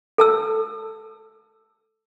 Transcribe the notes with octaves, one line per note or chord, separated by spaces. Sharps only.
A4 A5 E6